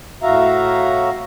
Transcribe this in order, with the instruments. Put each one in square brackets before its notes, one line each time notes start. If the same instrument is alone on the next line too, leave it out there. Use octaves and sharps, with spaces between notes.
[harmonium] A2 F#4 E5 F5 A#5